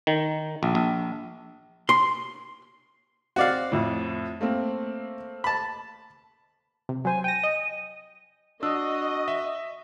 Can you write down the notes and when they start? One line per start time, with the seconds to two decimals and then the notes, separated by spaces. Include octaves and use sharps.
0.07 D#3
0.63 A#1
0.75 A#1
1.89 C6
3.36 C4 F#4 D5 F5
3.72 F2 A2
4.41 A3 A#3 C4
5.44 A5 B5
6.89 C3
7.05 F#3 C5 G#5
7.24 G5 A#6 D#7
7.43 D#5
8.63 D4 F#4 D#5 E6
9.28 E5